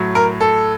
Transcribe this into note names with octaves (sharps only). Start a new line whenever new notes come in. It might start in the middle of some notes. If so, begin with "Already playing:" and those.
Already playing: A2 F#3
A#4
A4